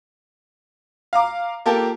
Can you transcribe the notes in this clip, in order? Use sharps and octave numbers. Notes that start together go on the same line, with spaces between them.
F5 A#5 D6
A#3 F4 G4 A4 A#4